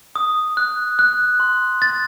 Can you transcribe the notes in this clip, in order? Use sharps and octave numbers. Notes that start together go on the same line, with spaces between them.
D#6
F#6
F#6
C6
A6